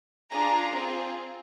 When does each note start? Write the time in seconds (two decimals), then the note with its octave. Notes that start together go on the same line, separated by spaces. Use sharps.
0.29 D4 F4 G#4 A#5
0.72 C4 F4 G#4